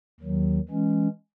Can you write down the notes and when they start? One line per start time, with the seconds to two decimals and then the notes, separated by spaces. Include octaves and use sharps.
0.20 D#2 D#3 F#3
0.69 E3 G#3 C#4